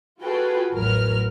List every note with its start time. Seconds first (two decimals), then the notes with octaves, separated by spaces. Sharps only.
0.22 F4 F#4 G#4 A4 B4 G5
0.73 A1 E2 F#3 A#4 B4 F6